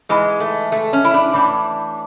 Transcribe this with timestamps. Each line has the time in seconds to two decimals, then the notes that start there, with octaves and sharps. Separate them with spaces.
0.09 G#2 E3 G#3
0.40 A3
0.72 A3
0.93 C#4
1.04 E4
1.14 D4
1.34 A2 E3